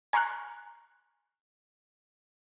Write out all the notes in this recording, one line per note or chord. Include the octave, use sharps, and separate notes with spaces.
G#5 A#5 C6 C#6 F6 F#6